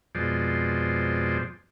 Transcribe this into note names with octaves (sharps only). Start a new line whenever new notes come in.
F2 B2 F3 G#3 C5 D5